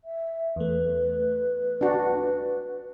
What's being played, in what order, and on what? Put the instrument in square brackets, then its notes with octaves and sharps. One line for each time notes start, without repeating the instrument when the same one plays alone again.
[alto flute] E5
[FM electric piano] E2 A3 [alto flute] B4
[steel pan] D4 F#4